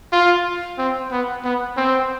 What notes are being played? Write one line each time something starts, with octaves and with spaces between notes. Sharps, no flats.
F4
C4
B3
B3
C4